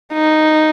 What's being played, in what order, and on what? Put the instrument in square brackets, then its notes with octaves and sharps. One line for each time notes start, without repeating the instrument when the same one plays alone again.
[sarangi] D#4